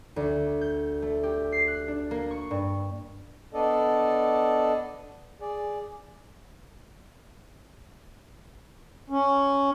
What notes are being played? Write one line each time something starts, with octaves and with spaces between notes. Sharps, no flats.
D2
G6
A3
G4
C7
F#6
D4
A#3
C#6
G2
B3 D4 A4 D5 D#5
G#4 D5
C#4